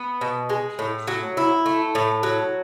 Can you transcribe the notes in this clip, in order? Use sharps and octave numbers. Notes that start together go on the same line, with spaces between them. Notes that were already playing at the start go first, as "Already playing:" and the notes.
Already playing: B3
B2
G#3
A2
F#3
E4
A3
A2
F#3